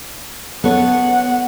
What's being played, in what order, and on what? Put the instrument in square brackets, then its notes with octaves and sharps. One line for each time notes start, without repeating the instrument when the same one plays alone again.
[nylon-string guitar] B3 A4 C#5 [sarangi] F#5